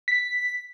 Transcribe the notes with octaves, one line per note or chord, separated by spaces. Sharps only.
B6